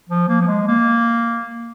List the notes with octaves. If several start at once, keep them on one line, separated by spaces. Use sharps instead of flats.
F3
A#3
F3
G#3
A#3